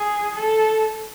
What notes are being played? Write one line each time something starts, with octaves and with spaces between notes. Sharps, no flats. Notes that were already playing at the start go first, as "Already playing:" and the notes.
Already playing: G#4
A4